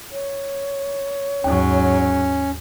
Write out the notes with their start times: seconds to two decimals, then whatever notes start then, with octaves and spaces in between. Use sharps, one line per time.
0.12 C#5
1.44 D#2 G#2 F#3 C#4